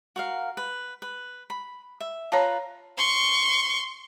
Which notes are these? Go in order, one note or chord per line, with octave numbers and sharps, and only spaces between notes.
F#4 A#4 F5
B4
B4
B5
E5
F4 B4 C#5 A5 A#5
C6 C#6